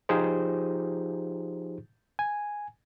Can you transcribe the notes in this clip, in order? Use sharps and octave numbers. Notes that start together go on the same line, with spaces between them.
F3 D#4 F4 G4 G#4 C5
G#5